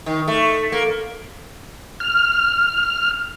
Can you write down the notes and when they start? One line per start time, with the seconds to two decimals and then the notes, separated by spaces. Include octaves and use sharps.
0.06 D#3
0.28 A3
0.72 A#3
2.00 F6